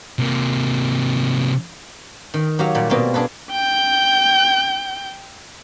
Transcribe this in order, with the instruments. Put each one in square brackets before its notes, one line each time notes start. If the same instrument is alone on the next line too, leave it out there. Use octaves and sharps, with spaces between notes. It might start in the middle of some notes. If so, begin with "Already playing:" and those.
[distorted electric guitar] C3 A#3
[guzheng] D#3
F#3 G4 C#5 F5
A#2 G3
B2 A#3 C4 F4
D4 G#4 A4 B4
[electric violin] G5 G6